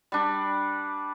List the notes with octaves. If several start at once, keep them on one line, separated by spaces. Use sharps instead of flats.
G3 D4